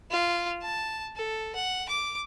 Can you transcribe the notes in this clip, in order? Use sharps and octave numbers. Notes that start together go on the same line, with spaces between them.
F4
A5
A4
F#5
D6